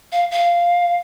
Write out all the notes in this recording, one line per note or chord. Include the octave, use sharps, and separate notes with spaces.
F5
F5